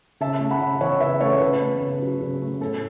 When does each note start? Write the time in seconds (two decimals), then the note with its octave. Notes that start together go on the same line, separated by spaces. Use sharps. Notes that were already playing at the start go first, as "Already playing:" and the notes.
0.20 C#3 E5 A5
0.40 A3
0.51 F#5 B5
0.61 C#3
0.81 E3 C#5 F#5
1.01 C#3 B4 E5
1.21 A3 A4 C#5
1.41 C#3 B4
1.61 A3
1.81 C#3
2.02 F#3
2.22 C#3
2.42 A3
2.61 A2 A4